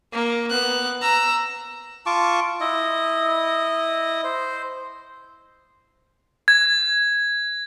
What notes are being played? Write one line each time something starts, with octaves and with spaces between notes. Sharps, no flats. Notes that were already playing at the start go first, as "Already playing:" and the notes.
A#3
B3 F#6
A#5 E6
F4 A5 C#6 D6
E4 D#5
C5
G#6